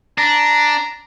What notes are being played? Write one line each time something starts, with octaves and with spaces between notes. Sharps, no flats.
D4 A#5